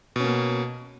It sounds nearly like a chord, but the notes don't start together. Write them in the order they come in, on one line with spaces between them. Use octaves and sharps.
B2 C#4 A#3